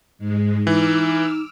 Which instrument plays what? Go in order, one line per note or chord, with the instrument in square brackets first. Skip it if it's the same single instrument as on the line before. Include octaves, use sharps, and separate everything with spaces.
[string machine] G#2 G#3
[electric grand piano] E3 [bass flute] D#4 [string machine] D6 E6 F6